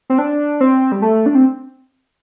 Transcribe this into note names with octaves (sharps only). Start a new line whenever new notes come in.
C4
D4
C4
G3
A3
D4
C4